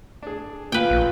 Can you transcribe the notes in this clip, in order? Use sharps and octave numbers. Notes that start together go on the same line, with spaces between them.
D4 G#4
A#2 F4 B4 G5
A#1